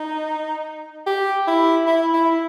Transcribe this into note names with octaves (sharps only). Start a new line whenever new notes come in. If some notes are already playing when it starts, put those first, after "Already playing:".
Already playing: D#4
G4
E4
E4
E4